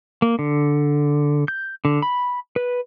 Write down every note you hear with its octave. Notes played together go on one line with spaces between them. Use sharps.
A#3
D3
G6
D3
B5
B4